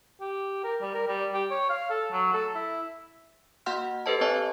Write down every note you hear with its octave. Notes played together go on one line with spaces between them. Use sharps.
G4
A#4
G3
A#4
G3
G4
C#5
F5
A4
F#3
A4
E4
A#3 F#4 F5 F#5 C6 F6
G4 A4 B4 C5 D#5 A5
C4 C#5 D#5 G#5 A5